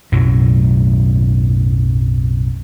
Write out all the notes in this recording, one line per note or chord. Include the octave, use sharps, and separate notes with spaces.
B1 F#2 A2 F#3